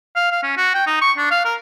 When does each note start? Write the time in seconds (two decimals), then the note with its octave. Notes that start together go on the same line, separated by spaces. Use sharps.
0.16 F5
0.31 F5
0.43 C#4
0.57 F#4
0.75 G5
0.87 D#4
1.02 C#6
1.18 D4
1.31 F5
1.45 A#4